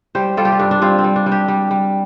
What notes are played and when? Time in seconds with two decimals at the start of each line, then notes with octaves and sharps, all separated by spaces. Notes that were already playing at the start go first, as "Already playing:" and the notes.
0.15 G3 G4 C5
0.37 G3 F4 A4
0.45 G4
0.52 F4
0.59 G2 D4
0.71 D4
0.82 G2 C4 F4
0.99 C4
1.04 G3
1.16 D4
1.26 G3
1.31 D4 G4
1.48 G3
1.71 G3